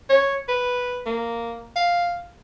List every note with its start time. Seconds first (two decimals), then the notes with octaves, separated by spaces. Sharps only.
0.09 C#5
0.49 B4
1.06 A#3
1.76 F5